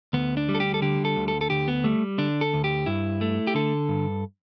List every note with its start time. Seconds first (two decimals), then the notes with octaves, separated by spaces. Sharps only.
0.13 D2 B3
0.37 D4
0.49 G3
0.55 A4
0.60 G4
0.74 A4
0.82 D3 G4
1.05 A4
1.16 D2
1.28 A4
1.41 A4
1.50 D2 G4
1.68 B3
1.84 G3 A3
2.18 D3 D4
2.41 A4
2.53 D2
2.64 G4
2.86 G2 E4
3.21 A3
3.47 G4
3.55 D3 A4
3.89 G2